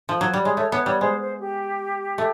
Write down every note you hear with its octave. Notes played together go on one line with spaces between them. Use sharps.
F3
F#3
G3
G#3 C#5
A3 C#5
B3 C#5
G3 C#5
G#3 C5
C5
G4
A3